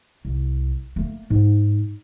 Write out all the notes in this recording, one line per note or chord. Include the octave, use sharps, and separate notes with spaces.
C2
A3 A#3
G#2